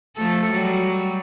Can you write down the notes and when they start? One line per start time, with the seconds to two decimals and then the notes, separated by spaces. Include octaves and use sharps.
0.16 F3 A3 A4
0.51 F#3 G3